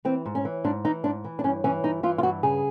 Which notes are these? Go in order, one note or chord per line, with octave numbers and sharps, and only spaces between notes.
E3 C4
G#2
C#4
E3
G#2 D4
E3 D#4
G#2 D4
E3
D4
G2 C#4
E3 C#4
G2 D#4
E3 F4
F4
G2 F#4
C#3 G#4